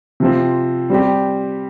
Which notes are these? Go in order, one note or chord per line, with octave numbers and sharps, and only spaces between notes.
C3 F3 C4
G3 C4 G4